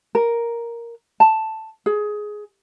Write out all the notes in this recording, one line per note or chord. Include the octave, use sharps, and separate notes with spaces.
A#4
A5
G#4